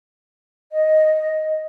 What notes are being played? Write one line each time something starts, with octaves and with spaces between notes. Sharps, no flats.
D#5